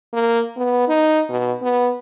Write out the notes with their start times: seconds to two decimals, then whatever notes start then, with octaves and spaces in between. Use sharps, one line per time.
0.13 A#3
0.57 B3
0.88 D#4
1.30 B2
1.62 B3